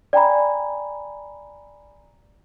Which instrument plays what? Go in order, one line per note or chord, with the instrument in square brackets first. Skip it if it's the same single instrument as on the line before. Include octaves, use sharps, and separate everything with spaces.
[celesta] D5 G5 G#5 A#5 B5